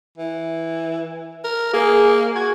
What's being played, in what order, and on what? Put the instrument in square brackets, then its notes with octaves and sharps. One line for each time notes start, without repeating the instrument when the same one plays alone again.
[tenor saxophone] E3
A#4
[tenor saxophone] A#3 [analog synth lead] G#4
[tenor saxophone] F#4 [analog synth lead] G#6